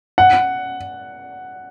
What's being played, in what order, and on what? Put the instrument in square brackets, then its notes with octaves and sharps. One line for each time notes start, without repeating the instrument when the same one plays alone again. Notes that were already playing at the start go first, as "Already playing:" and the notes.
[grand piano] F#5